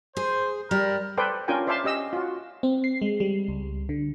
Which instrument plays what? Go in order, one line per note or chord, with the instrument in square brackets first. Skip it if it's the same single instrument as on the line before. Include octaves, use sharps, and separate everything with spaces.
[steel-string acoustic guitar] G#4 [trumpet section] C5
[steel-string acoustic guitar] G3 [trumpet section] A#4
[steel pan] A4 B4 C5 D5 G5
C#4 D4 F4 A#4 G5 G#5
C5 D5 E5 F5 A5 C6
C#4 G4 D#5 E6
F4 F#4
[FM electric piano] C4
C7
G#3
G3
C#2
D3